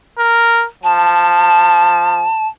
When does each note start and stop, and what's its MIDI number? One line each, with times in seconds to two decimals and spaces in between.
0.18 0.64 70
0.84 2.27 53
0.84 2.48 81